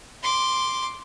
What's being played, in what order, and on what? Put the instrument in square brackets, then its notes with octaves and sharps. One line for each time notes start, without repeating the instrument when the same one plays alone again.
[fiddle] C6 D6